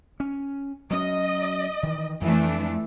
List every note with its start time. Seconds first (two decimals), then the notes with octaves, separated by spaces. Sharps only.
0.20 C#4
0.91 F#3 C#4 D#5
1.83 D#3 E3
2.21 F2 E3 A3 D4